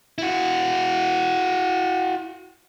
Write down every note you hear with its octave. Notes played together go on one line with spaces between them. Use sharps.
E4 F#4